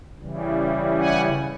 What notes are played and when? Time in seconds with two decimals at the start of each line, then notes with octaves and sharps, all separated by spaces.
0.20 C#3 E3 G3
0.98 F#5 G#5